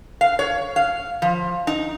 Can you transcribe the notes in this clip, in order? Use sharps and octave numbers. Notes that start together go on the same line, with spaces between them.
F5
C#5
F5
F3
D#4